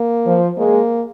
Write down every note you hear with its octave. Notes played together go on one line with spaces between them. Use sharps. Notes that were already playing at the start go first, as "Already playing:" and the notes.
Already playing: A#3
F3
G#3 A#3